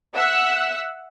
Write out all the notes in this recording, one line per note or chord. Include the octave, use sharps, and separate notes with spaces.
E5 F#5 E6 F#6